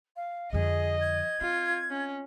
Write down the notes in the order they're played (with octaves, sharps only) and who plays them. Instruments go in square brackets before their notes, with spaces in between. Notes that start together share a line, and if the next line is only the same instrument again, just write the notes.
[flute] F5
[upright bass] F2 D3 [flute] G#4 [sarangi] D#5
[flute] G#6
[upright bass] C4 [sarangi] F4
[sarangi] C#4